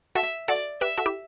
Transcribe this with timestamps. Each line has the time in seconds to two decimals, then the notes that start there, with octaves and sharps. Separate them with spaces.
0.15 F#4 A4 E5
0.48 F#4 A4 D5
0.81 G4 B4 E5
0.97 F#4 A4
1.06 E4 G4